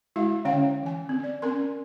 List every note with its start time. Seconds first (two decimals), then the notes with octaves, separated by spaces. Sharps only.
0.16 G#3 E4 F#4 E5 F5
0.45 D3 C#4 C#5 F5 G5
0.83 E3 G#5
1.09 C4
1.24 D5
1.42 C4 C#4 A#4 C6